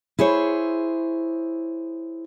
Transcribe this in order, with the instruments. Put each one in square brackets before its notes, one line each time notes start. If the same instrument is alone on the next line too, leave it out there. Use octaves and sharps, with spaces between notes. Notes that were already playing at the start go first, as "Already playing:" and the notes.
[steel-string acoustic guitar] E4 G#4 C5 C#5